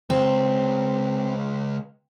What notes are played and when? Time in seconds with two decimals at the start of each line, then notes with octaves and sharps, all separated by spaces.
0.10 C#2 C4